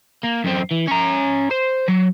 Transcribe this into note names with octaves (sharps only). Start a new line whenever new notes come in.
A#3
F#2 C4
E3
C#4 A#5
C5
F#3